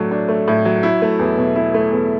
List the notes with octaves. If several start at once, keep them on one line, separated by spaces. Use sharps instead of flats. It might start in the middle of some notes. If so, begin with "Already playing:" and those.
Already playing: A2 F#3 A3 D4
D4
A3
A2
F#3
E4
A3
E2
B2
E4
A3
E2